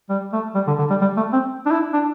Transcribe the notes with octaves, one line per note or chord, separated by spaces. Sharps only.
G3
A3
G3
D3
D3
G3
G3
A3
C4
D4
E4
D4